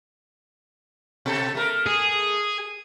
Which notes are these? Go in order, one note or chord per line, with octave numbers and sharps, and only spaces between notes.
B2 A4
A3 A#4
G#4